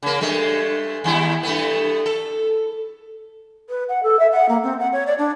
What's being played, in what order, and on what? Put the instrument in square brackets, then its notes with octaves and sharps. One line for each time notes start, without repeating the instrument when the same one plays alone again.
[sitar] C#3 A#3
G2 G#3 A3
D#2 G3 E4
G2 A3 B3
A4
[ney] B4
F#5
A4
E5
F#5
A#3
C4
F#5
C#5
D5
D4